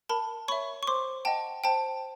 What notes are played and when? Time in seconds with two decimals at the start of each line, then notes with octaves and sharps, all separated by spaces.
0.09 A#4 A5 B5
0.48 C#5 E5 B5 C#6
0.83 C#6
0.87 C5 C6 D6
1.25 D#5 F#5 G5 A5
1.64 C5 G5 A5